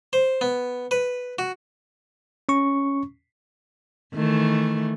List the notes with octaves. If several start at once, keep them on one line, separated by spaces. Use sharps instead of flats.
C5
B3
B4
F#4
C#4 C#6
D#3 E3 A3